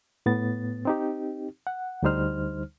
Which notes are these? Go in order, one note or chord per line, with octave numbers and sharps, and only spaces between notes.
A2 B3 A6
C4 D#4 G4
F#5
D2 D3 G3 D#4 C5 F6